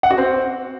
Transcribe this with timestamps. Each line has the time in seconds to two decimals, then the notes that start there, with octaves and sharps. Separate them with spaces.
0.03 F#5
0.11 F#4
0.18 C4